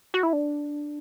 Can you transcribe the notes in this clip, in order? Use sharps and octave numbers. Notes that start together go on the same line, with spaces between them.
F#4
E4
D4